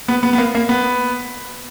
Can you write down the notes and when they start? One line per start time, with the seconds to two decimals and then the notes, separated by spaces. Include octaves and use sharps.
0.08 B3
0.23 B3
0.33 B3
0.38 A#3
0.55 A#3
0.69 B3